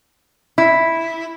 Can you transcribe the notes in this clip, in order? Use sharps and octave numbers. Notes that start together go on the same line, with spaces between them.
E4